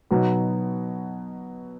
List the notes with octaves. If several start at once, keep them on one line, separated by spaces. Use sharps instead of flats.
B2 F#3 B3 D#4